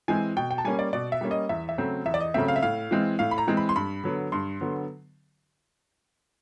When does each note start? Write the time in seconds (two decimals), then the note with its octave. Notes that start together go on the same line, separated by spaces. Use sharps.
0.08 E3 G#3 C4 G#5
0.36 B2 G5
0.51 G5
0.58 A5
0.64 G3 A#3 C#4 G#5
0.79 D5
0.93 B2 D5
1.12 E5
1.21 G3 A#3 C#4
1.31 D#5
1.49 E2 E5
1.69 E5
1.78 C#3 F#3 A3 C4
2.06 E2 E5
2.14 D5
2.21 D#5
2.34 C#3 F#3 A3 C4 E5
2.48 F5
2.56 E5
2.62 A2 F5
2.91 E3 G#3 C4
3.19 A2 F5
3.31 B5
3.38 A#5
3.47 E3 G#3 C4
3.57 B5
3.69 C6
3.75 G2 B5
4.04 D3 F#3 B3
4.32 G2 C6
4.61 D3 F#3 B3